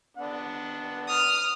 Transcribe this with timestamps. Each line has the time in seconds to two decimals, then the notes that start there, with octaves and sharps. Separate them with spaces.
0.17 B3 D4 F#5
1.08 D#6 F6